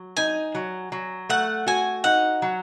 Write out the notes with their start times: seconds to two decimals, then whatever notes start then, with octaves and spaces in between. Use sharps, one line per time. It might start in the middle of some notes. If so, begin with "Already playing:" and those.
Already playing: F#3
0.17 D#4 G#5
0.55 F#3
0.92 F#3
1.29 A3 F#5
1.67 F#4 G#5
2.04 D#4 F#5
2.42 F#3